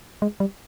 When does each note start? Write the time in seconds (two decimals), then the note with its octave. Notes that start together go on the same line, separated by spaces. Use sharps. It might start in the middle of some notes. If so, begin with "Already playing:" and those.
0.22 G#3
0.40 G3